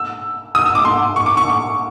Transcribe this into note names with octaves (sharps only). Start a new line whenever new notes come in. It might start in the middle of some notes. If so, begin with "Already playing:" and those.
Already playing: E6
D#6
E6
D6
C6
C#6
D6
C#6